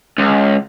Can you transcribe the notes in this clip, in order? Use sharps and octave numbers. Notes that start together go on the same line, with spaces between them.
C#2